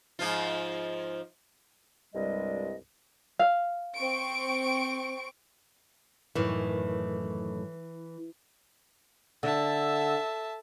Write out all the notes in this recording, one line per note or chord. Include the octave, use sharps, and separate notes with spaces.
G#2 F3 F4
C2 G2 G3 G#3 D#5
F5
C4 C#6 D7
F#2 A2 D#3 E3
D3 E5 A5